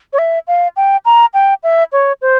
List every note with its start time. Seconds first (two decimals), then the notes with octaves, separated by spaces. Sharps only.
0.13 C#5
0.19 E5
0.48 F5
0.77 G5
1.05 A#5
1.34 G5
1.63 E5
1.92 C#5
2.22 C5